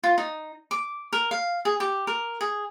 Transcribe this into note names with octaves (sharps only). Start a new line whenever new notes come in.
F4
D#4
D6
A#4
F5
G#4
G4
A#4
G#4